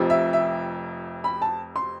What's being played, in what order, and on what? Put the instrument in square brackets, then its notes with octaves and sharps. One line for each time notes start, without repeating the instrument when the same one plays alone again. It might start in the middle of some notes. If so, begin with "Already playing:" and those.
Already playing: [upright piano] F1 F2 C3 F3
E5
E5
B5
A5
C6